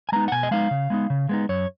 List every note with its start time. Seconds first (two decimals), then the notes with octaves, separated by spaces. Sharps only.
0.09 G#5
0.12 G#3 B3 D#4 A#5
0.28 F#5
0.32 B2 G#5
0.43 D#5
0.51 G#3 B3 D#4 F5
0.71 C#3
0.90 G#3 B3 D#4
1.10 C#3
1.29 G#3 B3 D#4
1.49 F#2 C#5